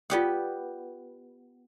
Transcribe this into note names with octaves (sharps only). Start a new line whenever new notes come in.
B3 F4 G4 D5 F#5 D#6